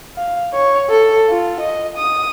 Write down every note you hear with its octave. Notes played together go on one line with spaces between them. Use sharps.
F5
C#5
A4
F4
D#5
D#6